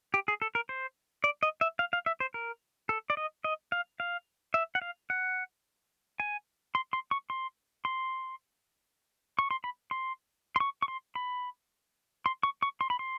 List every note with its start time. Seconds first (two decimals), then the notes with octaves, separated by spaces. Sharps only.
0.14 G4
0.28 G#4
0.42 A4
0.55 A#4
0.69 C5
1.24 D5
1.43 D#5
1.61 E5
1.79 F5
1.93 F5
2.06 E5
2.20 C5
2.34 A#4
2.89 A4
3.10 D5
3.17 D#5
3.44 D#5
3.72 F5
4.00 F5
4.54 E5
4.75 F#5
4.82 F5
5.10 F#5
6.20 G#5
6.75 C6
6.93 C6
7.11 C#6
7.30 C6
7.85 C6
9.39 C#6
9.51 C6
9.64 B5
9.91 C6
10.56 C6
10.60 C#6
10.82 C#6
10.88 C6
11.15 B5
12.26 C6
12.43 C#6
12.62 C#6
12.81 C6
12.90 B5
12.99 C6